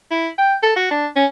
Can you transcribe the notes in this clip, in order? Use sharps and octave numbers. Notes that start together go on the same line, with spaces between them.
E4
G5
A4
F#4
D4
C#4